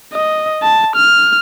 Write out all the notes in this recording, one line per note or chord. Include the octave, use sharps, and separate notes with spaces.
D#5
A5
F6